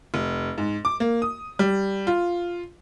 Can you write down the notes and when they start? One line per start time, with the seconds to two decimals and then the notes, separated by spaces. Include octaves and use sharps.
0.14 F1
0.58 G#2
0.85 D6
1.00 A#3
1.22 D#6
1.59 G3
2.07 F4